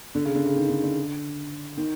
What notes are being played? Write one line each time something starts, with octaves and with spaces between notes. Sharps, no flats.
D3
C#3
D3
C#3
D#3
D3
D3
D#3